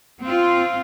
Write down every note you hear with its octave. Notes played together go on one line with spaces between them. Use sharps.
C4 F4